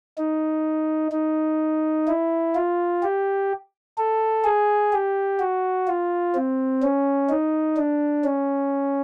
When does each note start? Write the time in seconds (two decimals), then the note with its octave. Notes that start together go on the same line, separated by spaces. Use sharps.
0.18 D#4
1.12 D#4
2.08 E4
2.55 F4
3.03 G4
3.98 A4
4.44 G#4
4.93 G4
5.40 F#4
5.88 F4
6.35 C4
6.83 C#4
7.29 D#4
7.77 D4
8.24 C#4